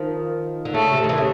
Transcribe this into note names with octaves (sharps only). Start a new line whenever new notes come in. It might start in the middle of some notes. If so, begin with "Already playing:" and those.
Already playing: D#3 F3
D3
C#3 A3
C3
D#3
D3 E3
C#3